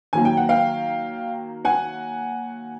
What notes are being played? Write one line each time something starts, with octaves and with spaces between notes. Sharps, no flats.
D#3 F#3 A#3 G#5
G5
F#5
F5 G5
F#5 G#5